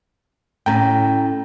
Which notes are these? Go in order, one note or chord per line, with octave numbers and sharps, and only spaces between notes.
A2 C#4 G5 A#5